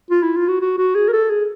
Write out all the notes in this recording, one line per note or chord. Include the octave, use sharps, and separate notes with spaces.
F4
E4
F4
F#4
F#4
F#4
G#4
A#4
A4
G#4